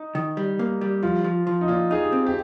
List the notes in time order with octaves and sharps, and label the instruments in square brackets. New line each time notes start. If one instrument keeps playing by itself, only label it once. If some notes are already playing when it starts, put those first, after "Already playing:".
Already playing: [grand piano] D#4
[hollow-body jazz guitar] D#3
G3
A#3
G3
[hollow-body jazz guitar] F3 [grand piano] F4
[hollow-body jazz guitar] F3
F3
[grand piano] D#4
[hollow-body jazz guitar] A#2 [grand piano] F4
[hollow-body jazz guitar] D#4 [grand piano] G#4
[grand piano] G4
[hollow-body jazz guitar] C4
[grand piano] G4